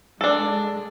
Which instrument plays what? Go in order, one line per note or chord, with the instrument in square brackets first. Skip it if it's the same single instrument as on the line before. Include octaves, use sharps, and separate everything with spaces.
[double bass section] G#3 [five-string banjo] D4 A4